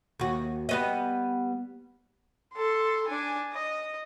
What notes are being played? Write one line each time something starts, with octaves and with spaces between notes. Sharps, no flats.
D#2 F#4
G3 B3 D#5
A4 C6
D4 G#5
D#5